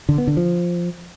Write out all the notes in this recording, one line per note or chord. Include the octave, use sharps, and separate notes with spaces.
D3
B3
D3
F3